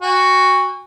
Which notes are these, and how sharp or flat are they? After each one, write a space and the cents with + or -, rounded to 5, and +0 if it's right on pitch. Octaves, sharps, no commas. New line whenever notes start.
F#4 +0 G#5 -45